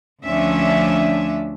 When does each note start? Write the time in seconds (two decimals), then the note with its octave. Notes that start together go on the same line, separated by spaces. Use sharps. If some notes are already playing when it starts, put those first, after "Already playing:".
0.23 D2 F3 C#4 D4 E5